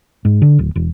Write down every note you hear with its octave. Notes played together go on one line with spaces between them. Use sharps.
G#2
D3
D1
E1